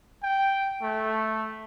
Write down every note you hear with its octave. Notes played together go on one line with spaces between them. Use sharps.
G5
A3